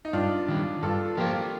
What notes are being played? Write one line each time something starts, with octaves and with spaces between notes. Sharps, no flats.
D#4
G2 D4 F4
D#3 G3
G2 F4 A4
F3 A#3 F4 G4 A#4